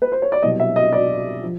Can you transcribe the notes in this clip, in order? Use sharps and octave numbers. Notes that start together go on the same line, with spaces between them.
B4
C5
C#5
D5
C2 B2 F#3 D#5
E5
D#5
D5
F3